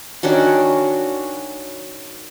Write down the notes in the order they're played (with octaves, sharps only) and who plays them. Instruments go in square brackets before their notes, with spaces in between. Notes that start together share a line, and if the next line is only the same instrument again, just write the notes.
[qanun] D#3 C#4 D4 F#4